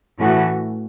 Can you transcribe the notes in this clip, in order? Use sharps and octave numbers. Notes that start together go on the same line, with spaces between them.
A2 E3 A3 C#4 F#4